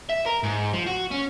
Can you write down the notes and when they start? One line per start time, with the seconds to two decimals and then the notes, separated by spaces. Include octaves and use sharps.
0.09 E5
0.26 A#4
0.43 G#2
0.74 F3
0.87 F#4
1.11 C#4